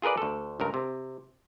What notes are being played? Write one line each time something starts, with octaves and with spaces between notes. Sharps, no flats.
F4 G#4 A#4 B4 D5
D2 A4
C#2 G2 A#4
C3